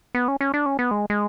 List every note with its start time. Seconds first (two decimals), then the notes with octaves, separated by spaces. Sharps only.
0.15 B3
0.28 C#4
0.41 C#4
0.54 D4
0.66 C#4
0.79 B3
0.91 G#3
1.10 G#3